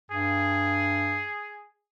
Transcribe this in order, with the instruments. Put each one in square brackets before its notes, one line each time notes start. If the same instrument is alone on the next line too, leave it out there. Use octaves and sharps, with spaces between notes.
[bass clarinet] G2 [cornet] G#4